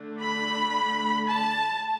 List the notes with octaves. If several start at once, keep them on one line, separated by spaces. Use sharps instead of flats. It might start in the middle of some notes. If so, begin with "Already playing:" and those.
Already playing: D3 A3 D4
B5
A5